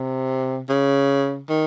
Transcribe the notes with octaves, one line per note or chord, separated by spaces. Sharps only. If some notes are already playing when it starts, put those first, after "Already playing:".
Already playing: C3
C#3
D#3